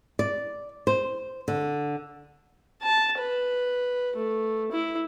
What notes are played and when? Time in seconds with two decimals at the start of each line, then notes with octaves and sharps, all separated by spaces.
0.19 D5
0.87 C5
1.48 D3
2.83 A5
3.18 B4
4.17 A3
4.72 E4